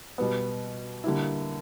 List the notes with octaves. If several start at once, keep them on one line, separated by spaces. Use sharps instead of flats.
B2 G3 B3
D3 G3 A#3 E4